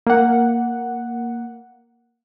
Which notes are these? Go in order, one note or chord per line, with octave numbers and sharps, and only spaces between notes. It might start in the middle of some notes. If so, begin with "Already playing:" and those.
A#3 F#5